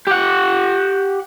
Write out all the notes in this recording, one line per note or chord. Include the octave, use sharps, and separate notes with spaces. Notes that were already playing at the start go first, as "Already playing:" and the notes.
G4 F#5